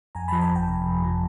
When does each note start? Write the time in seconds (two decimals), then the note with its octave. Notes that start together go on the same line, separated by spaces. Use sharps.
0.15 F2 G#5 A#5
0.28 F3 A5 B5
0.41 G#5 A#5
0.51 G1 G5 A5
0.68 C3
0.86 F2
1.04 F3